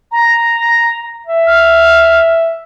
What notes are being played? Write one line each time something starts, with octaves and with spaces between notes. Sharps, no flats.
A#5
E5
F6